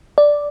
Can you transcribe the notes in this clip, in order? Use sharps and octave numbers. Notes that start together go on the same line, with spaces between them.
D5